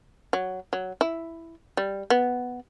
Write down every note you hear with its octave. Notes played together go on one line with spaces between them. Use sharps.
F#3
F#3
E4
G3
B3